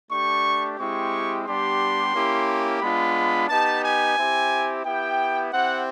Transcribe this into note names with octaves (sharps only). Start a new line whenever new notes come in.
A3 D4 G4 C#6
G#3 C4 E4 G4 C#6
G3 B3 D4 G4 C6
A#3 C#4 E4 G4
G#3 B3 D4 F4 B5
B3 D#4 G4 A5
G#5
C4 E4 G4
B3 E4 G4 G5
C4 E4 G4 F#5